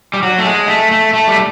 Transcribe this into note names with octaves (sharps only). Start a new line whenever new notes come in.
G3
F#3
A3
G#3
A3
A3
A3
G3